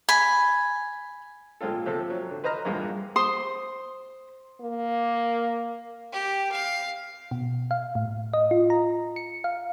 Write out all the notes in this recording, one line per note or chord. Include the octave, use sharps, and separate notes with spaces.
G#5 B5
A#2 G#3 C4 F4 A4
C3 F3 A4
F#3
D3
B4 C5 D#5 A#5 F6
E2 G2 A#2 G#3 A#3
C5 C6 D#6
A#3
G4
F5
B2
F5
A2
D#5
F4
A#5
C#7
F5